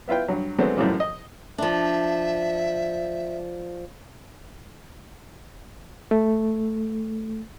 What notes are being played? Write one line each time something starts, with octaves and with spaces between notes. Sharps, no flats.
B3 E4 F4 B4 G5
G2 F#3
F#3 G#3 A3 B3 C4 D4
F#2 A2 C#3 E3 F3 G3
D#5
F3 D4 E5
A3